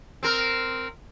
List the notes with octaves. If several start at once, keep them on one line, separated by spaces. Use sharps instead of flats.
C4 A#4